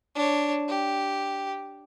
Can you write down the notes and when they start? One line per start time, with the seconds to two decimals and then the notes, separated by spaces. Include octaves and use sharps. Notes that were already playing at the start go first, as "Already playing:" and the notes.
0.15 D4 C#5
0.68 G4